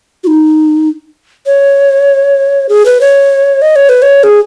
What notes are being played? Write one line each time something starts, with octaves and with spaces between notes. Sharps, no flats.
F#4
D#4
C#5
G#4
B4
C#5
D#5
C#5
B4
C#5
G#4